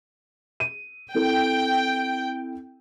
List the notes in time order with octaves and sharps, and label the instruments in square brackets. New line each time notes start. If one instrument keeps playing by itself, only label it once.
[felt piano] D#7
[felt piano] C4 E4 A4 [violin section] G5